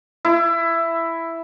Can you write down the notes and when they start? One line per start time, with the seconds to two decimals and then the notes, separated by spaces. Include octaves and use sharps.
0.25 E4